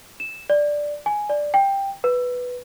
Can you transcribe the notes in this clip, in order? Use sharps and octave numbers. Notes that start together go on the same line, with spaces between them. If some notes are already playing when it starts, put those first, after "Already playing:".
E7
D5
G#5
D5
G5
B4